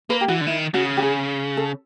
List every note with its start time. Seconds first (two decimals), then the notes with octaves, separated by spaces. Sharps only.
0.10 A#3 B4
0.21 G4
0.28 E3 F#4
0.41 D3
0.47 D#3 E4
0.74 C#3 F#4
0.97 G4
1.02 G#4
1.57 A4